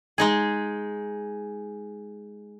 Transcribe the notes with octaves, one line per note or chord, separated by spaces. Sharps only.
G#3 D#4 G#4